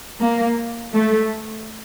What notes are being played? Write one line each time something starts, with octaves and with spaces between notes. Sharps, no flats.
A#3
A3